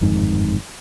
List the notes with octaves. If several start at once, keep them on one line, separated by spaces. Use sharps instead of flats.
G1 F2 G#2 D#3